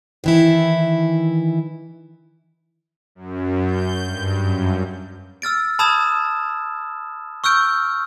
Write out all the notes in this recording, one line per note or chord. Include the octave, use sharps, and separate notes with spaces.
D#3 E3 E4
F#2
G6
G2
F#2
E6 F6 A6 D7
A5 B5 D#6 E6 G#6 E7
C#6 E6 F6 G6 D7